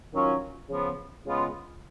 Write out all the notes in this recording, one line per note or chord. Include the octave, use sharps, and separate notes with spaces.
D#3 F#3 C#4 F4
C#3 F3 B3
C#3 G#3 B3 F4